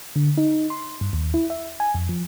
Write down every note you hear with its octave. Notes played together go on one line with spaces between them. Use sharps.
D3
D#4
C6
G2
D#2
E4
E5
G#5
F2
F3